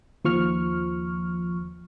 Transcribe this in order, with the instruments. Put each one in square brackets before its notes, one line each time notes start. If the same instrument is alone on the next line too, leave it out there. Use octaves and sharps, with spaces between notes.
[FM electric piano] D#2 F3 C#6 F6